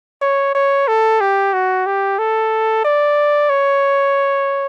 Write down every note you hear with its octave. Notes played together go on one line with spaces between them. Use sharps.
C#5
C#5
A4
G4
F#4
G4
A4
D5
C#5